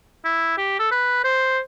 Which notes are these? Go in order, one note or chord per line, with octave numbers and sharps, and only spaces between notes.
E4
G4
A4
B4
C5